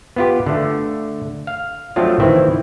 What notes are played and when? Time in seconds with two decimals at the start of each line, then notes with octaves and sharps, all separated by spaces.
0.16 B3 F4 G4
0.46 D3 A3
1.47 F5
1.96 F3 F#3 A3 C4 D4 F4
2.20 D#3 E3 C4 E4